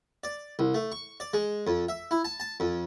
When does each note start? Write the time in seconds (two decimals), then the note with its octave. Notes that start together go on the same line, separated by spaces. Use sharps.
0.24 D5
0.59 C2
0.74 A3
0.92 C#6
1.20 D5
1.33 G#3
1.67 F2
1.89 E5
2.11 E4
2.25 A5
2.40 A5
2.60 F2